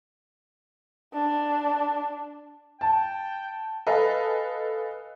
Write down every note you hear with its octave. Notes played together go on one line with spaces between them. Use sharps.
D4
G5 A5
A4 B4 D#5 F5 G#5